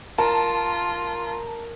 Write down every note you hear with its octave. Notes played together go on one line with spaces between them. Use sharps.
F4 A#4 A5